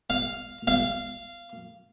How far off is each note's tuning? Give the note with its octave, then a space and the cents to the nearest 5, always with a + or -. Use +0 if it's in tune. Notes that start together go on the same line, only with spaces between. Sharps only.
F5 -5
F5 -15